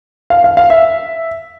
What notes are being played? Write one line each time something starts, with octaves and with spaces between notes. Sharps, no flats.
F5
F5
F5
E5